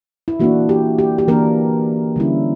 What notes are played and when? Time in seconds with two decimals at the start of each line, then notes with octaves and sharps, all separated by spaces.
0.28 E4
0.40 E3 A#3 D4 F#4
0.69 G4
0.99 G4
1.18 G4
1.28 E3 A#3 D4 A#4
2.16 D3 G3 C#4 E4